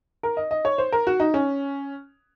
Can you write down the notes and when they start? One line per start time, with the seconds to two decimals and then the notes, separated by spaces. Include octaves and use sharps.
0.23 A#4
0.37 D#5
0.51 D#5
0.65 C#5
0.78 C5
0.92 A#4
1.07 F#4
1.20 D#4
1.34 C#4